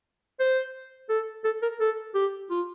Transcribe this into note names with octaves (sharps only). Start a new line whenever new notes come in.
C5
A4
A4
A#4
A4
G4
F4